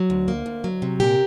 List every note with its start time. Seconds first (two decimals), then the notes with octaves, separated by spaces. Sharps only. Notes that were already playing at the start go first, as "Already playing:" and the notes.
Already playing: F#3
0.10 D2
0.28 A#3
0.46 D2
0.64 F#3
0.82 C3
1.00 A#2 G4 A#4